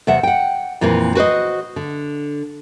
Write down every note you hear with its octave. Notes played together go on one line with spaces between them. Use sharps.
E2 C3 E5 F#5
F#5 G5
F2 A#2 E3 A#3 C4
F#4 B4 C5 D#5
D3